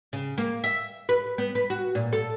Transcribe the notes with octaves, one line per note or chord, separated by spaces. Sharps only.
C#3
A#3
E5
B4
B3
B4
F#4
A#2
A4